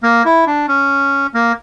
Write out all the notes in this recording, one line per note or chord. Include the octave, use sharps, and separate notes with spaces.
A#3
E4
D4
C#4
A#3